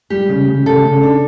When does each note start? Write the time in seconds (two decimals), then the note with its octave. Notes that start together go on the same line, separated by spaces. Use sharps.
0.10 G3 G4
0.29 C#3
0.48 C#3
0.66 C#3 A4
0.85 C#3
1.03 D4